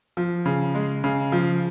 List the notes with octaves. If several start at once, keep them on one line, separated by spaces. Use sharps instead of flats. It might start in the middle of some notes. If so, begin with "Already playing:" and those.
F3
C#3
G#3
C#3
F3